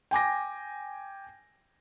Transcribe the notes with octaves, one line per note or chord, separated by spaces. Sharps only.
G5 G#5 D6 A#6